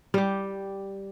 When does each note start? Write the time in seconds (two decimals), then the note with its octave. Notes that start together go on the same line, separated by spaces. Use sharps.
0.14 G3 G4